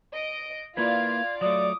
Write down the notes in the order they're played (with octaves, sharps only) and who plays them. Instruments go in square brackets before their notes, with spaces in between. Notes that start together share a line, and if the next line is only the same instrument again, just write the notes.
[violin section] D#5 D7
[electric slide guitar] A#3 E4 B4 [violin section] F4 D5 F5 [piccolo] G#6
[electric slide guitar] F#3 A3 [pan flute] D5 [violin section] D6 [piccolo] D#6